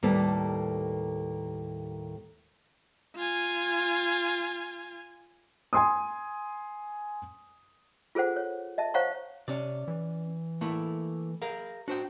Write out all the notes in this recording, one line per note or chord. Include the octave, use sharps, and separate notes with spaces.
D#2 A2 G3 A#3 A4 B4
F4 G#5
G#5 C6 D#6
F4 G#4 A4 C5 F#5
C#5
D#5 E5 A5
C5 C#5 F5 F#5 A#5 C#6
C3 C#4 D5
E3
A3 A#3 E4
G#4 A#4 F5
D4 F#4 C5 G5